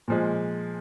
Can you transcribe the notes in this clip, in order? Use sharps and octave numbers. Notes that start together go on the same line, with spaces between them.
A#2 F3 G#3